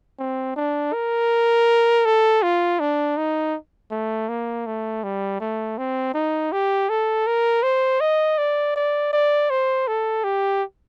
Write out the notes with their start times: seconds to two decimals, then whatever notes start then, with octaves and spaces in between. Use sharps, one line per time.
0.19 C4
0.56 D4
0.93 A#4
2.05 A4
2.42 F4
2.80 D4
3.17 D#4
3.91 A3
4.29 A#3
4.66 A3
5.03 G3
5.40 A3
5.78 C4
6.14 D#4
6.52 G4
6.89 A4
7.27 A#4
7.63 C5
8.00 D#5
8.38 D5
8.76 D5
9.13 D5
9.50 C5
9.87 A4
10.24 G4